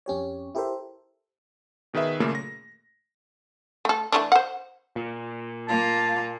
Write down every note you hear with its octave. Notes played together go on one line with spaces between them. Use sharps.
F2 C#4 G4 C#5
E4 G4 A4 A#4 C5 E5
B2 D#3 G#4 B4 E5
F#2 A#2 C#3 A3 A#3
A#6
A3 A4
E3 A3 D4
C5 F#5
A#2
A#3 F4 A5